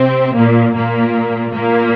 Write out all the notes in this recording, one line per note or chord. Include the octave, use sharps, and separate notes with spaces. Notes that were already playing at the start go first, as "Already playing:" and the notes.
Already playing: C3 C4
A#2 A#3
A#2 A#3
A#2 A#3